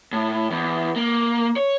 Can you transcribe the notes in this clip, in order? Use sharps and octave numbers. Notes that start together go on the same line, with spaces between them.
A2
E2
A#3
C#5